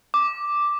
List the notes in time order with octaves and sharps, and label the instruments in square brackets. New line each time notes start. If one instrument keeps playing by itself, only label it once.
[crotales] D6